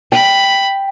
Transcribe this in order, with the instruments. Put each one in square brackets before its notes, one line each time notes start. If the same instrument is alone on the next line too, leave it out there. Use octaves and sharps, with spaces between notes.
[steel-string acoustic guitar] G5 [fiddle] B5